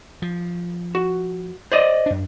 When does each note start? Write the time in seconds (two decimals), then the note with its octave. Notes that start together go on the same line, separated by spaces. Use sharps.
0.22 F3
0.95 F#4
1.72 C5 D5 D#5
2.06 F#2 D4